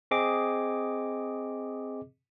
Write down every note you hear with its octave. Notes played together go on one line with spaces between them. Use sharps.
C4 G#4 D#5 D6